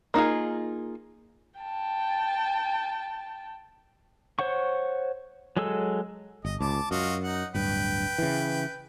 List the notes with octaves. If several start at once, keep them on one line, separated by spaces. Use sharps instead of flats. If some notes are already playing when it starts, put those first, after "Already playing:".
A#3 D#4 F4 G#4
G5 A5
C5 C#5 F#5 C#6
F#3 G#3 G#4 A4 E6
G1 D#5
C#2 A5 D6
F#2 F4 F#4 D#5
D#4 F#5
D1 G2 B4 G5
C#3 E3